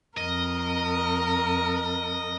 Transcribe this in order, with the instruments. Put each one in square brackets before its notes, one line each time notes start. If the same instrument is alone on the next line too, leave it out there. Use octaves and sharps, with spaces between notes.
[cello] F2 A#4 [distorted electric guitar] D#5